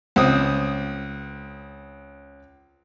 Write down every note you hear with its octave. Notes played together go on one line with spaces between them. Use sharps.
C#2 C4 D#6